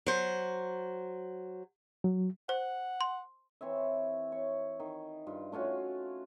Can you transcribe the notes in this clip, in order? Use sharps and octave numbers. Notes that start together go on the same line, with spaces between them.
F#3 C5
F#3
C5 F#5
C6
E3 C4 C#5 E5
C#5
D#3
G2 F4
A3 C#4 F4 F#4